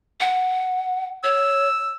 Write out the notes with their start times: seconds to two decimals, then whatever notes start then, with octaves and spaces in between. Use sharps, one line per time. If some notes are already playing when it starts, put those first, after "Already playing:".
0.20 F#5
1.24 C#5 E6